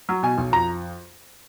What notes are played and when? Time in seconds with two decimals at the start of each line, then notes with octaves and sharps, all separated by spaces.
0.09 F#3
0.23 B2 G#5
0.38 B1
0.52 F2 A#5